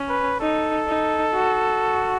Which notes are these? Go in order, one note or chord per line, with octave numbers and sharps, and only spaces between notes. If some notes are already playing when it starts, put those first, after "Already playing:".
Already playing: C#4
B4
D#4 A4
D#4
F#4